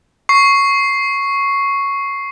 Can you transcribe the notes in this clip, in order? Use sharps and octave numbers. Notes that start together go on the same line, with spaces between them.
C#6 C7